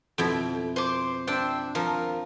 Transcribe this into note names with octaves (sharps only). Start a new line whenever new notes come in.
F2 B2 E4
C5 D6
D4 C5 E5 G5
F3 A#4